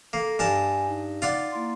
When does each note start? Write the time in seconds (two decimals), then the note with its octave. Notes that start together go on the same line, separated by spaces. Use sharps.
0.13 A#3 A4
0.39 G2 A#4 G#5 A5
0.88 D#4
1.22 F4 D5 F#5
1.52 A#3 E4 C6